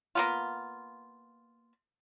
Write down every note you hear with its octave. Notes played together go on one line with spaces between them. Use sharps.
A#3 B3 F4